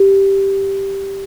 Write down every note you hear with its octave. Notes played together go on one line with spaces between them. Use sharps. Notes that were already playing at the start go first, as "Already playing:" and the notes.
Already playing: G4